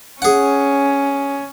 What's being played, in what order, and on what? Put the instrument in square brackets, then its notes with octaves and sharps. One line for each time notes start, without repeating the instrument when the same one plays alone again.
[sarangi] C#4 [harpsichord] G#4 F#5